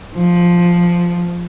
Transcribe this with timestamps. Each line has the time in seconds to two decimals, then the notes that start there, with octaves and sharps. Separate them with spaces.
0.15 F3